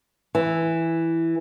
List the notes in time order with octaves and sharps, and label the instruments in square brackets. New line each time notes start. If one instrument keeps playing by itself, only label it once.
[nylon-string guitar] E3